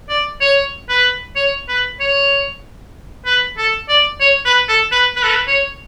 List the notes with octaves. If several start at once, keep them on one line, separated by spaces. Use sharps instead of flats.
D5
C#5
B4
C#5
B4
C#5
B4
A4
D5
C#5
B4
A4
B4
B4
A4
B4
C#5